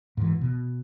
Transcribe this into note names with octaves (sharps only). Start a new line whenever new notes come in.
G#2 E3
B2